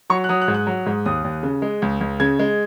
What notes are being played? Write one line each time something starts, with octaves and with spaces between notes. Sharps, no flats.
F#3 C#6
F#6
F#3 D#6
F#6
G#2
F#6
F#3
G#2
D#2 D#6
D#2
C#3
G#3
C#2
C#2
C#3 G#6
G#3